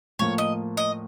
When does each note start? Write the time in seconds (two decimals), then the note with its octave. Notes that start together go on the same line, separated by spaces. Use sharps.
0.19 A2 F3 A#3 C#5
0.38 D#5
0.77 D#5